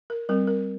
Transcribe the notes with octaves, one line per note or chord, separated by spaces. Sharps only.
A#4
G3 C4 A#4
A#4